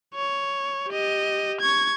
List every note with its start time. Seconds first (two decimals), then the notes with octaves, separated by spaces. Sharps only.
0.15 C#5
0.89 G4 D#5
1.61 C#6 G#6